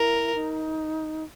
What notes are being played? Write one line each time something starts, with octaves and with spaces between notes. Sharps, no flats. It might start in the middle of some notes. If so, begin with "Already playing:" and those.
Already playing: E4 A#4
D#4